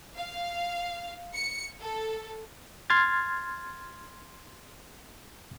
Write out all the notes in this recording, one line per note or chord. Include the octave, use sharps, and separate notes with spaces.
F5
C#7
A4
C6 F6 G#6 A6